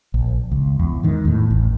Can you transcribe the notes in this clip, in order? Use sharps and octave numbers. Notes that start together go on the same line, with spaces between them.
A#1
C#2
E2
G#2 D#3
E2 A2
A1